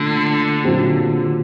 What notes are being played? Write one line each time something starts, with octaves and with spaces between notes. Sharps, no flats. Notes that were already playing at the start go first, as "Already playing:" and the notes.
Already playing: A#2 D3 A3
A#2 F#3 C4 G4